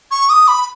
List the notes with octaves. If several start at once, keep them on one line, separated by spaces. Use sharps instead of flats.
C#6
D#6
B5